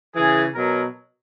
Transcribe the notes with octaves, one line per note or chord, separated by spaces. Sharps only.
C#3 E3 G#4
B2 F#3 A#4